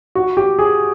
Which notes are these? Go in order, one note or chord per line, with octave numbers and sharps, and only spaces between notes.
F#4
G4
G#4